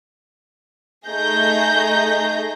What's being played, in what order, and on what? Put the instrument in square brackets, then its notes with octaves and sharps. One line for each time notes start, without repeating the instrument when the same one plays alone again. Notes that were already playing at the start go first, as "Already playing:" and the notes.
[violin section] A3 D#4 G#4 G6 A#6